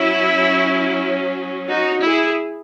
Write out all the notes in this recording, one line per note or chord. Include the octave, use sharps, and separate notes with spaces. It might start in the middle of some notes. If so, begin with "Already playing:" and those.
Already playing: F#3 C#4 E4
D#4 F#4
E4 G#4